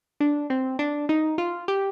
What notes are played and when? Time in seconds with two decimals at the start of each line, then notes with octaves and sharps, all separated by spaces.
0.20 D4
0.50 C4
0.79 D4
1.09 D#4
1.38 F4
1.68 G4